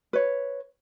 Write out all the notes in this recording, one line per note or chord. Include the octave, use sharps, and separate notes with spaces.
B4 C#5